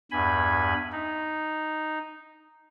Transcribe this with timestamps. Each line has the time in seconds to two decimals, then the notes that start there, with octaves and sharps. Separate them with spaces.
0.11 E2 G2 G#5 B5
0.92 D#4